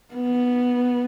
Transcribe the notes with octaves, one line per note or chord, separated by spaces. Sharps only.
B3